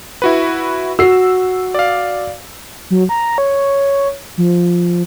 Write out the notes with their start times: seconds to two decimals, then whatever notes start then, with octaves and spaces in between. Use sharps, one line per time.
0.22 E4 F#4 B4
0.99 F#4 E6 C7
1.74 D5 F5
2.90 F#3
3.09 A#5
3.38 C#5
4.38 F3